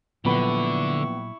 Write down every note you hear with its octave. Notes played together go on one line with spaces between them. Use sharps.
A#1 A#2 D3 F#3 B3 E4 B5 C#6